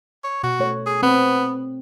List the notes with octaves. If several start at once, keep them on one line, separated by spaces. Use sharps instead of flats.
C#5
B2 F#4
A3 C#5
G#4
B3 C4